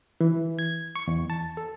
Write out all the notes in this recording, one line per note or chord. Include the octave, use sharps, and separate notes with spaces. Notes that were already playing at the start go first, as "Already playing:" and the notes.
E3
G#6
C#6
E2
A5
A4